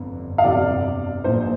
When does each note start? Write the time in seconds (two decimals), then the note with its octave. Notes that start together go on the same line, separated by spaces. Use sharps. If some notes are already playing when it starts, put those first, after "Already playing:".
Already playing: G1 F2 D3
0.38 F5
0.44 G1 F2 C3 D5
1.24 A#1 A#2 C5